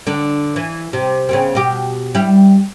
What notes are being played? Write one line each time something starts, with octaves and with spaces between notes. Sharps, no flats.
D3 D4
E3
C3
C#3 B3 C4
B2 G4
G3 E4